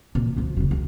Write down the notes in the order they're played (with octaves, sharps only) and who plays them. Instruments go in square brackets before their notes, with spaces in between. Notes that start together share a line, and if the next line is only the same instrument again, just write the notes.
[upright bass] A#2 E3
D2 F3
E1 C#3
C#2